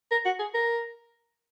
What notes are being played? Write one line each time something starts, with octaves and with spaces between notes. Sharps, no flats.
A#4
F#4
G#4
A#4